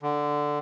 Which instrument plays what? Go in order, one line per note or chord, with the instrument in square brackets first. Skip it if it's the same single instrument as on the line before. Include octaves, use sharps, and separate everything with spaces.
[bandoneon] D3